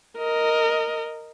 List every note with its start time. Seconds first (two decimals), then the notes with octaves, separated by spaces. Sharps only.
0.18 A#4 D#5